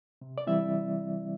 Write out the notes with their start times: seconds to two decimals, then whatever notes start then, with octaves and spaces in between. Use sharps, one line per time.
0.22 C3
0.38 D5
0.47 E3 G3 C4 E4 E5